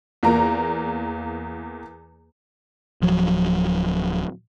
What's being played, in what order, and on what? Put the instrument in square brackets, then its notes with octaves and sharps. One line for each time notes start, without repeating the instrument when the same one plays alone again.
[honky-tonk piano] E2 A#3 A#5
[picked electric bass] D1 F3 F#3